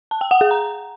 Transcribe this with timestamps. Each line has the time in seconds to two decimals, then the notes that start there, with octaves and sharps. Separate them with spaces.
0.11 A5
0.21 G5
0.31 F#5
0.41 G#4
0.51 A#5